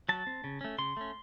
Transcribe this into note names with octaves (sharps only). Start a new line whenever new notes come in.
F#3 A5
C4
C#3
A3 C#4
C#3 C6
A3 C#4